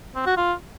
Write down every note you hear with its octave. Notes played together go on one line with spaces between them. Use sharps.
C4
F#4
F4